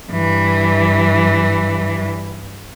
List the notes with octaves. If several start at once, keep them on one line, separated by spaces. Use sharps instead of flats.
G2 E3